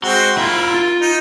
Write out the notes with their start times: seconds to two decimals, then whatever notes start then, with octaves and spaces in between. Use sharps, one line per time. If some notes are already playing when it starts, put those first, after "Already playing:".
0.04 G#3 C4 F#4 C6
0.38 A#3 E4 F4
0.74 F4
1.01 D#4